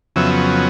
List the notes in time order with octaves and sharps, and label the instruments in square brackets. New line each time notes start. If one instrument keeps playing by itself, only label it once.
[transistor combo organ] F2 C#3 F#3 B3 E5